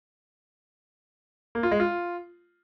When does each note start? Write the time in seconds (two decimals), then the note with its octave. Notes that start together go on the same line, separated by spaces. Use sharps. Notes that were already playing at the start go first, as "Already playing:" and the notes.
1.55 A#3
1.63 F4
1.71 G#3
1.80 F4